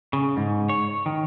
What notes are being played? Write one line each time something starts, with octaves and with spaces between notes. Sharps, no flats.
C#3
G#2
C#5
D#3